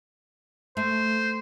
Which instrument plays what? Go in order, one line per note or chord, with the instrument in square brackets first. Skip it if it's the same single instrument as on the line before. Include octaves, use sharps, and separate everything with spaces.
[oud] A3 [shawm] C5